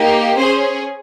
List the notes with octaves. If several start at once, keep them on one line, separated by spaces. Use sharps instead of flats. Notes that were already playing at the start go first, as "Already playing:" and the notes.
Already playing: A#3 D#4 G4
C#4 G#4 C5